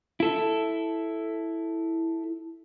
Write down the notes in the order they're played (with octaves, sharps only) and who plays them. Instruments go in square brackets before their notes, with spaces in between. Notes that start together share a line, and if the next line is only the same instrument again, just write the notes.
[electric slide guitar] E4 A4